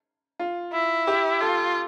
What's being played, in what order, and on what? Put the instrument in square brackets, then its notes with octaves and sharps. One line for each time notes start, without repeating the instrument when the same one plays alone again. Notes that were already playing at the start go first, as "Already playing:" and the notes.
[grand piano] F4
[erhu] E4
[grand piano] G4
[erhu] F4 [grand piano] A4